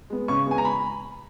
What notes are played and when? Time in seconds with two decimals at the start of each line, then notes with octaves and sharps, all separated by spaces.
0.10 G#3 B3
0.28 C#3 C#6
0.47 G#3 B3 G#5
0.58 A#5
0.65 B5